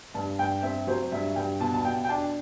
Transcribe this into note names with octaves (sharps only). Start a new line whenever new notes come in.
G2 A5
G2 G5
C4 E5
F#3 C5
G2 E5
G2 G5
B2 A5
A5
B2 G5
G5
D4 A5